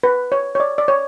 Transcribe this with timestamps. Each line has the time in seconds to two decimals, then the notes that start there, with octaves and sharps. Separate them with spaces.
0.03 B4
0.32 C#5
0.55 C#5
0.60 D5
0.78 D5
0.88 C#5